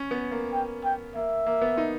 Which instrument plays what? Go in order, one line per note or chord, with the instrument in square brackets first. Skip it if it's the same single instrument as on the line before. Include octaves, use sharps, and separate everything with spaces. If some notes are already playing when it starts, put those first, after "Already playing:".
Already playing: [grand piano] C#4
B3
A#3
[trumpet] G5
G5
[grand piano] A#3 [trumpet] E5
[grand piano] A#3
B3
D#4